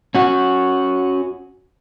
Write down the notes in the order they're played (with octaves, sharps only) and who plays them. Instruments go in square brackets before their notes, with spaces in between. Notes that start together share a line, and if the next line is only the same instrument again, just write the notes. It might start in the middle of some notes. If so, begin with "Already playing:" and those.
[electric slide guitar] C#4 F#4